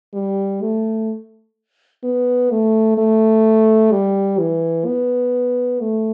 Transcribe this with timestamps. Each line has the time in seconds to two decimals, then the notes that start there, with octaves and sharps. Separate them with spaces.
0.14 G3
0.62 A3
2.04 B3
2.51 A3
2.98 A3
3.92 G3
4.39 E3
4.86 B3
5.81 A3